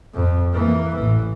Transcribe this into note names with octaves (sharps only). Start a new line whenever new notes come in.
F2
E3 A#3
A1 E3